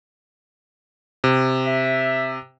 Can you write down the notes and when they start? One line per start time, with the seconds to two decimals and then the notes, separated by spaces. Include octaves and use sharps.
1.24 C3
1.66 E5